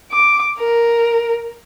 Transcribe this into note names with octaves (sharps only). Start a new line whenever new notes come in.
D6
A#4